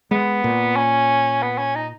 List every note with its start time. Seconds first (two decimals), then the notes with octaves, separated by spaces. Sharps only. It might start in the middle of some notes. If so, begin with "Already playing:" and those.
0.11 G#3 B3
0.44 A#2
0.76 C#4
1.42 B3
1.58 C#4
1.75 D#4